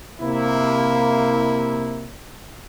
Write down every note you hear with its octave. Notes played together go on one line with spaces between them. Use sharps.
C3 A#3 E4